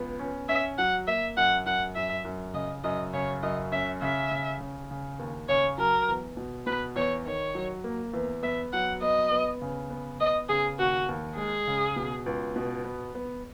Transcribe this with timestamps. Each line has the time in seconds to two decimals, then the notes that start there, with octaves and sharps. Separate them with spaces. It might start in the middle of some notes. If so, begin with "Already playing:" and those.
Already playing: C#2 B3
0.19 C#4
0.49 C#4 E5
0.78 F#3 F#5
1.07 A#3 E5
1.37 F#2 F#5
1.66 F#2 F#5
1.95 F#2 E5
2.25 F#2
2.54 C#3 D#5
2.84 F#2 D#5
3.13 C#3 C#5
3.43 F#2 D#5
3.72 C#4 E5
4.02 C#3 E5
4.31 C#3
4.60 C#3
4.91 C#3
5.19 D#2
5.49 C#3 C#5
5.78 F#3 A#4
6.08 E2
6.37 B2
6.66 B2 B4
6.96 E2 C#5
7.26 D#3 C#5
7.55 F#3
7.84 A#3
8.14 E2
8.43 B3 E5
8.73 F#3 F#5
9.02 B3 D#5
9.32 B3
9.61 C#3
9.90 B3
10.20 B3 D#5
10.49 C#3 G#4
10.78 D#2 F#4
11.09 D#2
11.38 G#3 G#4
11.67 C#3
11.96 B2
12.26 C#2
12.56 B2
12.84 B3
13.15 B3